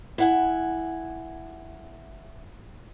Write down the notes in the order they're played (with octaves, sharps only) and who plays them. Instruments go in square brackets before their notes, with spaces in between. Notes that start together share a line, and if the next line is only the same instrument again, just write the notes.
[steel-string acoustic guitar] E4 F#5 G#5